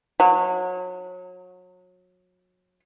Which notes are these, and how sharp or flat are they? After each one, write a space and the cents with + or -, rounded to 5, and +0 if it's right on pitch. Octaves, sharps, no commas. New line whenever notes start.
F#3 -30